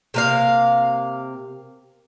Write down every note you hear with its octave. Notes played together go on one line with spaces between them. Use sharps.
C3 A#3 F5